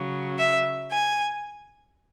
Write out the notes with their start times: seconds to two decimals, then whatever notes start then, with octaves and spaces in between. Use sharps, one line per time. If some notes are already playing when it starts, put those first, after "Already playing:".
Already playing: C#3 F#3
0.38 E5
0.91 G#5